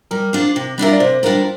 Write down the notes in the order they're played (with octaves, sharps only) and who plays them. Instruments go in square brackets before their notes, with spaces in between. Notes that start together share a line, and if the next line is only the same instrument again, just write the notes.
[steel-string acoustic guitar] G3 [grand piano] A#4
[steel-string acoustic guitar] D4 F4 C5
C3
[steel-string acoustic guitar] G3 D4 F4 A#4 [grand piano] E5
[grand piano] D5
[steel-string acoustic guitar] C3 [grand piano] C5
[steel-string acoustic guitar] G3 D4 F4 A#4